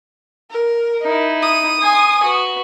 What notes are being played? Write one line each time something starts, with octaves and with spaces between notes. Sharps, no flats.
A#4
D#4 E4
D#6
G#5 C6
F#4 B4